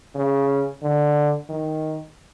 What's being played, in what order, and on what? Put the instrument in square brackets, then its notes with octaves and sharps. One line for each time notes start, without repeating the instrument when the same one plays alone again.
[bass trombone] C#3
D3
D#3